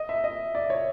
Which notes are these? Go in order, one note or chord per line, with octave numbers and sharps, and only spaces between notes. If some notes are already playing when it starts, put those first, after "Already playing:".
Already playing: D#5
E5
D#5
D5
C#5